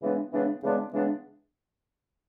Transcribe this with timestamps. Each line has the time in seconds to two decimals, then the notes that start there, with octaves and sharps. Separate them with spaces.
0.02 C#3 E3 G#3 B3 D4
0.32 C#3 E3 G#3 B3 D4
0.62 C#3 E3 G#3 B3 D4
0.93 C#3 E3 G#3 B3 D4